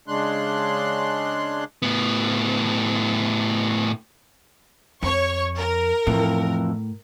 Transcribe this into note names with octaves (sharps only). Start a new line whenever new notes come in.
C#3 G#3 D4 C6 F#6
A2 B3
F2 C#5 C#6
A#4
F2 A2 E3